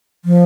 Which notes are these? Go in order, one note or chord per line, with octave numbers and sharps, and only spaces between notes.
F3